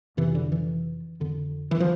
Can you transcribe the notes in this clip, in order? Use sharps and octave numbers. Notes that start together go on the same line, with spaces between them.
F2 C3 E3
D3
E3
F2 D3
E3
F3